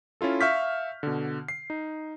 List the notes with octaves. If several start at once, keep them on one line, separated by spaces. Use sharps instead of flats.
C#4 E4 F4 A4
E5 F5 C#6 F6 G6 B6
B2 D3
C7
D#4